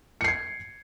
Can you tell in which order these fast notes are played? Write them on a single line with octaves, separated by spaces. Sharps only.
C#7 C7 G#6